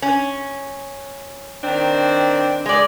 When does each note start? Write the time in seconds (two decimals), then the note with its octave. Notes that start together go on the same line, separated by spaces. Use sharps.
0.02 C#4
1.64 D#3 C4 D4
2.66 G#3 D5